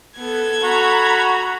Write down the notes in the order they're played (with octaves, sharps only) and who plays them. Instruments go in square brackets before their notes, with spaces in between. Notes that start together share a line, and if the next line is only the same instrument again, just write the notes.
[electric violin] B3 [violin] A4 G#6
[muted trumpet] F#4 [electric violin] A#5 B5